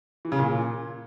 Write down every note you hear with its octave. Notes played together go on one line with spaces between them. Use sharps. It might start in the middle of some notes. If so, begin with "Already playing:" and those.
E3
C#3
A#2